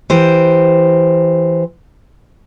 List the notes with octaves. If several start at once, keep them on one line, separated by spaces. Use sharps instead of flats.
E3 G4 C5